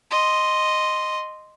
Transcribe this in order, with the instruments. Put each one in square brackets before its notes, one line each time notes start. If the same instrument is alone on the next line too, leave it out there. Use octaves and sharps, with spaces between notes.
[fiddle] D#5 C6